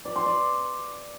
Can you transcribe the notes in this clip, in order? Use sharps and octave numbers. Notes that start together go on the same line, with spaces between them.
D5
C6
D5